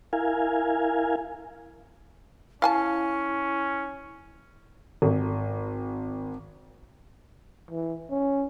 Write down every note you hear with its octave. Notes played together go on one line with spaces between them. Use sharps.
E4 A#4 F5 G#5
C#4 E4 F5 G#5 A5
G#1
E3
C#4